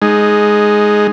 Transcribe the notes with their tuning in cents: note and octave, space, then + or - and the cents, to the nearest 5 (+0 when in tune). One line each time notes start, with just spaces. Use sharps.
G#3 +5 D#4 -5